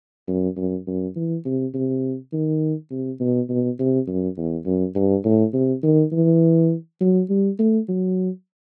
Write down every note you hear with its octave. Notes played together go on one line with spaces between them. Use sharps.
F#2
F#2
F#2
E3
C3
C3
D#3
C3
B2
B2
C3
F#2
E2
F#2
G2
A2
C3
D#3
E3
F#3
G3
A3
F#3